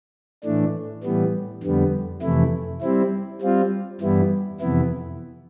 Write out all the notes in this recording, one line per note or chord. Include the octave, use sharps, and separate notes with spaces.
A2 E3 A3 D4
A2 E3 G3 B3
F2 D3 G3 B3
F2 C3 E3 A3 E4
G3 C4 E4
G3 C4 F4
G2 E3 G3 B3 E4
F2 C3 E3 B3 E4